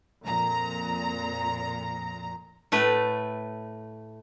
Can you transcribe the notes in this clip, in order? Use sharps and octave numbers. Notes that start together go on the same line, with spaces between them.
F2 A#2 A#5
A2 A3 B4